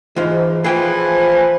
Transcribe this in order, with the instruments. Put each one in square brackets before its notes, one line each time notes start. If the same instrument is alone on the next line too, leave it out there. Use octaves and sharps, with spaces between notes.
[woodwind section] G#2 [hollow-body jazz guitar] E3 F4
[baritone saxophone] E3 [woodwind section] F3 [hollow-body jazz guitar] G#4 G5